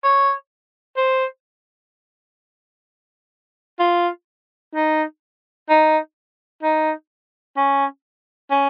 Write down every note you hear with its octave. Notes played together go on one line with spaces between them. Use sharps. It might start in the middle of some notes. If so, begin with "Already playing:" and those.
C#5
C5
F4
D#4
D#4
D#4
C#4
C#4